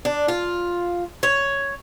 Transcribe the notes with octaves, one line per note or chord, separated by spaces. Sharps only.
D4
F4
C#5